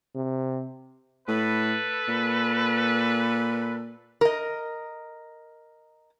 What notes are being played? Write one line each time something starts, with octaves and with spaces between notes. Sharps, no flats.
C3
A2 A4 B4
A#2
A#4 D#5